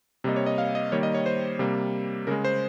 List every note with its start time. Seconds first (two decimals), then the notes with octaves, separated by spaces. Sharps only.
0.24 C3 G3 A#3 D#5
0.36 C#5
0.46 D#5
0.58 F5
0.75 D#5
0.92 D#3 G3 A#3 C#5
1.03 D#5
1.14 C#5
1.26 C5
1.59 C3 G3 A#3
2.27 C#3 G#3 A#4
2.45 C5